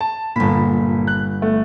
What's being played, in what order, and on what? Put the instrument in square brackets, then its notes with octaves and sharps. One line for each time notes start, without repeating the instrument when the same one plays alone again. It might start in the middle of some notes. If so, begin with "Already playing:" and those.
[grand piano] A5
[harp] G1 B5 [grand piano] A#2
[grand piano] F#6
A3